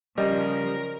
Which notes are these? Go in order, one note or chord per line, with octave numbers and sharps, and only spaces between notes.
C#3 F3 G3 A#4 D#5